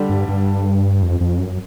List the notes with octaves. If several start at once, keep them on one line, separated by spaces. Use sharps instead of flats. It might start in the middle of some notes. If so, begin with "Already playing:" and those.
Already playing: D3 G3 D4
G2
G2
F2
F2
F#2